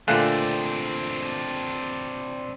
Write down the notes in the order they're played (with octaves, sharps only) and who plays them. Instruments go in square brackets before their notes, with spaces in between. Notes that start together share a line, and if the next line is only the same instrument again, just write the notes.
[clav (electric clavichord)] A#2 D3 A3 [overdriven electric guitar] C4 D4 [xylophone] F5 G#5 F#6